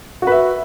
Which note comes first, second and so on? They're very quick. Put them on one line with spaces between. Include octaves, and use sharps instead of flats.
F#4 B4 E5